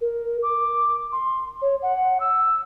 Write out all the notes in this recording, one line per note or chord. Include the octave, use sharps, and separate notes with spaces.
A#4
D6
C6
C#5
F#5
E6